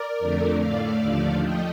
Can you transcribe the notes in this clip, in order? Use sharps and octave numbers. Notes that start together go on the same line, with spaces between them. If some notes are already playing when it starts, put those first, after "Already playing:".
Already playing: A#4 D5
F2 D3 A3
A2 A3 D5 F5
D#2 D3 F3 A3
F3 A3 D#5 G5